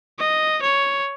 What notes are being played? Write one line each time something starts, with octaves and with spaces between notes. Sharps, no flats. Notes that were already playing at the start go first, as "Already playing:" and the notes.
D#5
C#5